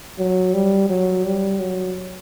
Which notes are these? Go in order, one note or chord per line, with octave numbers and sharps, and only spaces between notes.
F#3
G3
F#3
G3
F#3